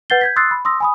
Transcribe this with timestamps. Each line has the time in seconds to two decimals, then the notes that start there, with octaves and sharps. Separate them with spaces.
0.10 B4 F#5 G6 A6 C7 G7
0.21 G6 G#6 B6
0.36 C6 D#6 E6 F#6 A6 C7
0.51 B5
0.65 C6 D#6 E6 A#6
0.80 G#5 B5 D#6